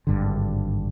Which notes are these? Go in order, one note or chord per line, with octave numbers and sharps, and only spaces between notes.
G#1 G2 D3